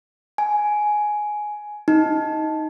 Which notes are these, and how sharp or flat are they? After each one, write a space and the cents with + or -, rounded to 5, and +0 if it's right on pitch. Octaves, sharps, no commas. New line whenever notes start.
G#5 +10
D#4 +15